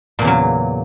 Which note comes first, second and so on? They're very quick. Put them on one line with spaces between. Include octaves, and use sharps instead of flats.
A#2 E2 C#3 F#3